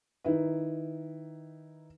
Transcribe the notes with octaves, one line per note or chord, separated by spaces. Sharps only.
D#3 D#4 E4 B4